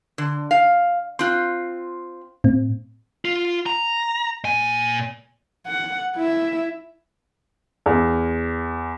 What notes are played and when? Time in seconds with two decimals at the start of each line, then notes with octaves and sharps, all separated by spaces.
0.18 D3
0.51 F5
1.19 C4 F4 C6 F#6
2.44 A2 C4
3.25 F4
3.66 A#5
4.44 A#2 G#5
5.67 F#5
6.16 E4 E5
7.86 E2